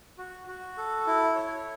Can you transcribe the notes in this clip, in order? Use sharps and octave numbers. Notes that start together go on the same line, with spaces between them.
F#4
F#4
A4
E4
C#5